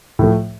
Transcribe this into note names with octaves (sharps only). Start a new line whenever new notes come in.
A2 F3 A3